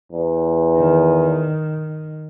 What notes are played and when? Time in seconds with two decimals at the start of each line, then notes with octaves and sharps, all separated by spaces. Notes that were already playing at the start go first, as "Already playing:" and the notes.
0.12 E2
0.77 D#3